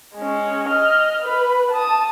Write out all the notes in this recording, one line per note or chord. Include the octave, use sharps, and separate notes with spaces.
G#3 C#4
D#5 F6
B4
A5 D#6